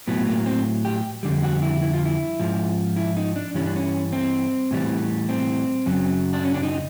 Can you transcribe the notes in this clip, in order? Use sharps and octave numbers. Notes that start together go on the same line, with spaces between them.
A2 F#3 B3
A#3
C4
G4
F2 D3 G3
F#4
E4
E4
F4
E4
G#2 F3
E4
D#4
D4
G2 E3 G3 C#4
D4
C#4
C4
A2 E3 G3
C4
F#2 C#3 F#3
D4
C#4
D4
D#4